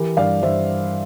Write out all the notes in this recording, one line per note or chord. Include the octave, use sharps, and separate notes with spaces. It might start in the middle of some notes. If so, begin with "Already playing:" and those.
Already playing: E3 G4 A#4
G2 D5 F5
G2 C5 E5